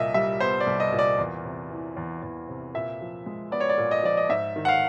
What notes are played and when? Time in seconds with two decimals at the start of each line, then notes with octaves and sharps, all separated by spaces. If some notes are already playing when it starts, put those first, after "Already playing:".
Already playing: C2 A#2 D#5 E5
0.14 G3 E5
0.40 B3 C5
0.60 D5
0.66 C2
0.80 D#5
0.92 A#2
0.99 D5
1.18 E2
1.45 C3
1.71 E3
1.97 E2
2.22 E2
2.49 C3
2.74 A#2 E5
3.01 F3
3.26 G#3
3.52 B3 D5
3.60 C#5
3.69 D5
3.78 A#2
3.91 D#5
4.03 F3 D5
4.17 D#5
4.29 G#2 E5
4.56 D#3
4.65 F#5
4.68 F5